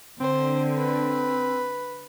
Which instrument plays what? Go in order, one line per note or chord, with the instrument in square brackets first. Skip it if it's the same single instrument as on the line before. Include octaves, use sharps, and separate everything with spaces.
[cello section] D3 [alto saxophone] C4 [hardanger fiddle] C5
[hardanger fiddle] B4